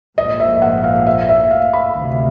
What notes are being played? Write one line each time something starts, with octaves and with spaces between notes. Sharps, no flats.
A#1 G#2 F3 A#3 D#5
E5
F#5
F5
E5
E5
F5
B5
D2 C3 D#3